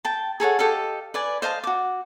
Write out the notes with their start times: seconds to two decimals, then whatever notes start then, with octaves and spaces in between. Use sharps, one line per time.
0.05 G5 A5
0.40 G#4 A4 C#5 F#5
0.59 G4 A4 D#5 F5
1.14 B4 D5 G#5
1.42 C5 D#5 F5 A5
1.64 F#4 D6